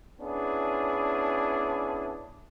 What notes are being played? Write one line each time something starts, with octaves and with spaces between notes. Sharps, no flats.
B3 C#4 D4 E4 G#4